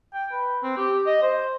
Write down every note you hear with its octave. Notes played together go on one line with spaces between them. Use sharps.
G5
B4
C4
G4
D#5
C5